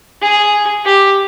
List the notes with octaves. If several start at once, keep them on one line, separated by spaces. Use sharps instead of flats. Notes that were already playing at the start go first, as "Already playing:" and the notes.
G#4
G4